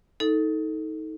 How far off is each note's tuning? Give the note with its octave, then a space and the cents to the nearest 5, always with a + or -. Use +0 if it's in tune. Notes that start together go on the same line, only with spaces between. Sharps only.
D#4 +25 A4 +0